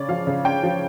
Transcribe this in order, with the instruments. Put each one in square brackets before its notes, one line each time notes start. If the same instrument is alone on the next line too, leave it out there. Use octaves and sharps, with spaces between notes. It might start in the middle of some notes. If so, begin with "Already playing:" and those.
Already playing: [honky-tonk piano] C#3 C#4 D5
F3 F5
C#3
C#4 G5
F3